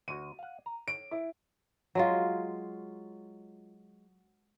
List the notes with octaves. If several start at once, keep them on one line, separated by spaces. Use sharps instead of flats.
D2 F#4 D#7
F5 F#5
A#5
C#5 D7
E4
F#3 G#3 F4